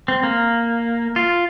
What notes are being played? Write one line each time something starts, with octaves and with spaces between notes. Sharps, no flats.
C4
A#3
F4